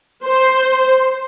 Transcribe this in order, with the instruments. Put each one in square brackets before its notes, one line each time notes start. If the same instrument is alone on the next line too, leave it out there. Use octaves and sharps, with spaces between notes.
[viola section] C5